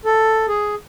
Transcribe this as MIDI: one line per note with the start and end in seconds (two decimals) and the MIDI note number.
0.05 0.46 69
0.48 0.75 68